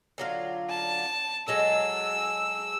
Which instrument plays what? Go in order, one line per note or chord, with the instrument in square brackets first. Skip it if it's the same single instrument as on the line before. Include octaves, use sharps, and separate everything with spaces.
[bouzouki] D3 F#3 F4
[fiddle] A5
[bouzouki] F#3 G#3 A4 [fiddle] E6